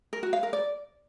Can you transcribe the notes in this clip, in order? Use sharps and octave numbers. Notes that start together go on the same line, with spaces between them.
A#4
F#4
F5
A#4
D5